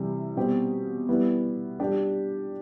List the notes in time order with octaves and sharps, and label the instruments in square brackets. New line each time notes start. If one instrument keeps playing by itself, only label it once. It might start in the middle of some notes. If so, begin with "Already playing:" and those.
Already playing: [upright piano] C3 E3 G3
B2 G3 C4 G4
G3 B3 E4
G3 D4 G4